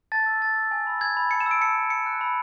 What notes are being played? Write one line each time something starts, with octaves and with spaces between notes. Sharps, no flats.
A5 A6
E6
A5 A6
E6
G#5
B5 E6
G#5 G#6
B5 E6
A5 C#7
E7
E6 D7
A5 C#7
E6
B5 C#7
F#6
B5